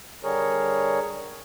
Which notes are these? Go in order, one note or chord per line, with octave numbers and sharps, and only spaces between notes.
D3 G3 G#4 A#4 C#5